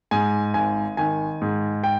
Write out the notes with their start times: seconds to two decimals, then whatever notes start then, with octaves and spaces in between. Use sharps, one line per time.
0.11 G#2 G#5
0.54 G#1 G#5
0.97 D#3 G#5
1.41 G#2
1.84 G5